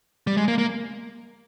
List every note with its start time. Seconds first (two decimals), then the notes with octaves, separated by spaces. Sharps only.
0.27 G3
0.37 G#3
0.48 A#3
0.58 A#3